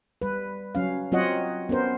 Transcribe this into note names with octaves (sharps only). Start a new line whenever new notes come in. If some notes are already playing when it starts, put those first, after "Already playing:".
G3 B4
F#3 C#4 F5
F#3 C4 F4 C#5 D#5 F#5
B3 C#4 A#4 C5